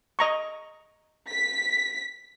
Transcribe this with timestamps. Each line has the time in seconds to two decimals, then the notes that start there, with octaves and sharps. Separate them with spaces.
0.19 D#5 A#5 C#6
1.30 B6